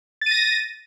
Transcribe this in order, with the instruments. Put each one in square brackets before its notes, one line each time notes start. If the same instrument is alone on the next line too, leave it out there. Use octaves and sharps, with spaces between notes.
[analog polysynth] A6
D#7
A#6